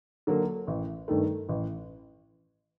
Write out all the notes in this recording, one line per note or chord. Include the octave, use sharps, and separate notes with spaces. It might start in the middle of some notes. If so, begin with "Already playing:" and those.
D3 F#3 A#3
A1
G2 D#3 A3
A1